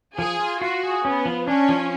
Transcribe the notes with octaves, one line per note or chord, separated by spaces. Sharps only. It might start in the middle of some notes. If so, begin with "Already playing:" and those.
F3 G#4
F4
F4 F#4
G#4
B3 C#4
F3
C#4 D4
F3